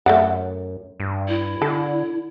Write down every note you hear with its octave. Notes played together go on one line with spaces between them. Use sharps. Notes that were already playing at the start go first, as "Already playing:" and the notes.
F#2 A3 D5 F#5
G2
E4
D3 A4